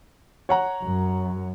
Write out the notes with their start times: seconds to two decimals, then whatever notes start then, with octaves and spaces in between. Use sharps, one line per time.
0.49 C#5 F#5 A#5
0.83 F#2